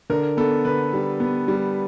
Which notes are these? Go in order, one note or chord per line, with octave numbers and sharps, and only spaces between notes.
D3 A#4
B3 A4
D3 B4
G3
B3
G3